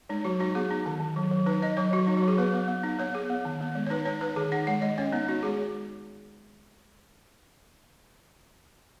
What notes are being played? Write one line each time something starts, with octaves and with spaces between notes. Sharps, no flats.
G#3 D#4
F#3 F#4
D#4 F#4
B3 G#4
D#4
D#3
D#3
F#3
F#3
D#4 B4
D#4 D#5
F#3 C#5
F#3 F#4
F#3 D#4
F#4
F#3
G#4
B3 B4
B3
B3
D#4
B3 C#5
B3 G#4
B3
D#3
B3
G#3
C#5
D#4 B4
D#4 C#5
D#4 B4
D#3 G#4
D#4 F#5
G#3 F#5
G#3 D#5
C#4 C#5
B3 D#4
D#4 F#4
G#3 G#4